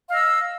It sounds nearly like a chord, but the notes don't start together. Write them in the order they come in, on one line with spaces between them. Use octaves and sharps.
F5 D#5 E6